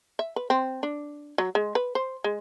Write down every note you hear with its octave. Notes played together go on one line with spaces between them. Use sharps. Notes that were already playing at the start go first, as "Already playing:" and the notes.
E5
B4
C4
D4
F#3
G#3
B4
C5
G#3